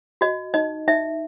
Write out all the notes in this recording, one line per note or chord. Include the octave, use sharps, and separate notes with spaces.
F#4 D#5
D#4 D#5
D#4 E5